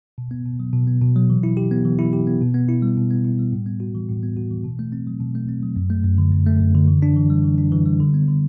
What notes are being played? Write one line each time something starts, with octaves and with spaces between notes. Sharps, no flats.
B2
B3
B2
F#3
B2
B3
B2
F#3
E3
E4
G4
B3
E3
E4
G4
B3
B2
B3
E4
G3
B2
B3
E4
G3
A2
B3
F#4
E3
A2
B3
F#4
E3
B2
A3
C4
F#3
B2
A3
C4
F#3
F#2
A3
F#2
D3
F#2
A3
F#2
D3
E3
D4
E3
G3
E3
D4
E3
G3
D3
B3
D3